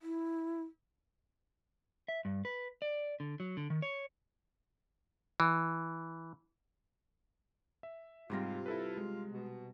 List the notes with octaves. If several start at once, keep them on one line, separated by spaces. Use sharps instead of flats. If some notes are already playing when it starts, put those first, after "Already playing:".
E4
E5
G2
B4
D5
D3
F#3
D3
D#3
C#5
E3
E5
G#2 C3 G3 C4 F4 A#6
E4 A4 B4
G#3
B2